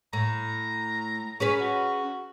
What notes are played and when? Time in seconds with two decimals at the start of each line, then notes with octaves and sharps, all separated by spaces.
0.13 A2 A#5
1.40 C#4 G#4 B4
1.60 F#4